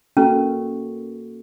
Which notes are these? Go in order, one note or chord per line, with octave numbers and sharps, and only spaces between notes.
A#3 C#4 F#4 A4